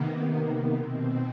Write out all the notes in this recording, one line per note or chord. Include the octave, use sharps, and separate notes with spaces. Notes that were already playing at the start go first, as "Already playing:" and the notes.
Already playing: C3 D#3 A#3 B3
B3
B2 C4